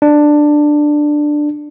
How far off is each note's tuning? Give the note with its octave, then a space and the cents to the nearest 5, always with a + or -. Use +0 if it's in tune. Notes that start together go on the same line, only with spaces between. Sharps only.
D4 +10